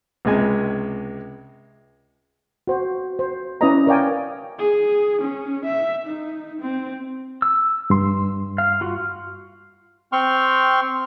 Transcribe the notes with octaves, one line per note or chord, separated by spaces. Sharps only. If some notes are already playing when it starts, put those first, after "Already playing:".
C#2 C3 G#3 G#5
F#4 C5
C5
C#4 E4 B4 D5 D#5 A#5
A#4 C#5 D5 F5 G5 G#5
G#4
C#4
E5
D#4
C4
E6
G2 C6
F5
F4 F#4
C4 G5 C6 C#6 F6